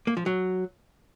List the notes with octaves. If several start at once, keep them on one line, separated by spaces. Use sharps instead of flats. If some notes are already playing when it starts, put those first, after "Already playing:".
A#3
F3
F#3